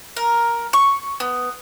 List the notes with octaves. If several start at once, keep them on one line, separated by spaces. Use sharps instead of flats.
A#4
C#6
B3